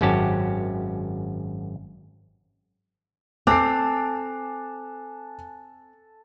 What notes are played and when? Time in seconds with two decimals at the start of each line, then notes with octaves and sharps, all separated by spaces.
0.01 G#1 F#2 C#4 F#4 G4 A5
3.47 C4 A4 G#5 D6 F#6 C7